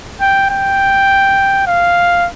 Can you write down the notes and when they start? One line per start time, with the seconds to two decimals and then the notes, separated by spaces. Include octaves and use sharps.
0.21 G5
0.50 G5
1.67 F5